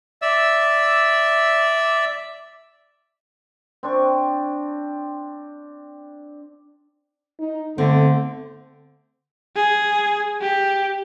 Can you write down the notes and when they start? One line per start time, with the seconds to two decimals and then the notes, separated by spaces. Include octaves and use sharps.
0.22 D5 E5 E6
3.83 C4 D4 C#6
7.39 D#4
7.78 D3 A3 C4 D5
9.56 G#4
10.41 G4